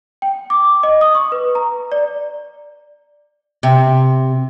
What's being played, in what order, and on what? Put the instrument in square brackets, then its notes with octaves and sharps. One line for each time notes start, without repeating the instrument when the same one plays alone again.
[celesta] G5
D6
D#5
D#6
C#6
B4
A#5
D5
[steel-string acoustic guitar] C3